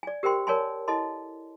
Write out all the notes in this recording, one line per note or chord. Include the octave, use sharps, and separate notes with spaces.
D5 G#5
G4 A#4 C5 G5 C6
A#4 C#5 D5 G#5 A5 C6
E4 A4 D#5 A5 C6